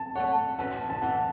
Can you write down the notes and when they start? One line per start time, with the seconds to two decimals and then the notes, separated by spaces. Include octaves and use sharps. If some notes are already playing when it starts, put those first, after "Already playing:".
Already playing: A5
0.15 A3 E4 A4 C#5 F#5
0.58 A2 E3 C#4 F#4 B4 A5
0.90 A5
1.02 A2 E3 A3 F#5